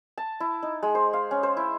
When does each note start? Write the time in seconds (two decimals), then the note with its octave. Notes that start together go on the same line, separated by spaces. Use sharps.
0.18 A5
0.40 E4
0.63 D#4
0.83 G#3
0.95 C5
1.13 F5
1.31 C#4
1.43 C5
1.57 E4